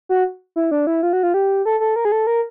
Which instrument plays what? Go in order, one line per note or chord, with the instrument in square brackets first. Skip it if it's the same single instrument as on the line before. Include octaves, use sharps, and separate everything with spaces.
[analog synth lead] F#4
E4
D4
E4
F4
F#4
F4
G4
A4
A4
A#4
G#4
A4
A#4